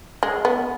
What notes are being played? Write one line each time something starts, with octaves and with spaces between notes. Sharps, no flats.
G#3
B3